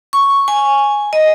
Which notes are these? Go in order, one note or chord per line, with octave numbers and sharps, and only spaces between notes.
C#6
G#5
D#5